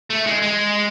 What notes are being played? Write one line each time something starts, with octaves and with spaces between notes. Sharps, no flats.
A3
G#3
G#3